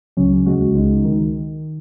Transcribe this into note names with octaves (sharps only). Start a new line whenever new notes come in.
C#2 C#3 F#3 C#4
D#2 C#3 G#3 F#4
C#2 C#3 G#3 D#4
D#3